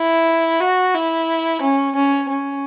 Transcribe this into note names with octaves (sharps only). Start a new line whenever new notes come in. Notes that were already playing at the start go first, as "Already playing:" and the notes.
Already playing: E4
F#4
E4
C#4
C#4
C#4